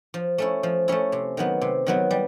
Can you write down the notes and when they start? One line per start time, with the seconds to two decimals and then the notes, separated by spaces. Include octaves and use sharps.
0.14 F3
0.38 A3 C#4 E4
0.63 F3
0.88 A3 C#4 E4
1.12 C3
1.37 D#3 F#3 B3
1.62 C3
1.86 D#3 F#3 B3
2.11 G3